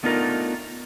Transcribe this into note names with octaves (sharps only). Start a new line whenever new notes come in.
A3 B3 D4 D#4 F4 A#4